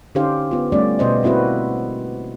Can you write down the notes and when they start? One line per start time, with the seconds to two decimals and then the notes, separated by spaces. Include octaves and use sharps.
0.15 D3 C#4 D#4 G4 C5 F5
0.51 B3 F4
0.72 G3 A3 B3 C#4 G4 D5
0.99 B2 B3 C5 D#5
1.23 A#3 C4 E4 F#4 B4